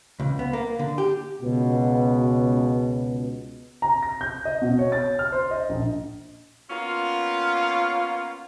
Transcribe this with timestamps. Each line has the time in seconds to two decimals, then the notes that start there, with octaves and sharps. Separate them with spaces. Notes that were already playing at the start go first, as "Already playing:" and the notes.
0.20 C#2
0.39 B3
0.53 A#3
0.79 D3
0.98 G4
1.42 C#2 B2
3.82 A#5
4.03 A#6
4.21 G6
4.45 D#5
4.62 B2
4.79 C#5
4.92 A6
5.19 F6
5.32 C5
5.51 D#5
5.69 A#1
6.70 A#3 B3 C#4 F4